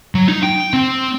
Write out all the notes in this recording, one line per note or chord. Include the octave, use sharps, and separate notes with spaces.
F#3
D#4
G5
C4